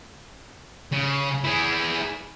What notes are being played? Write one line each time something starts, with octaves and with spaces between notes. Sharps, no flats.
C#3
E4 G#4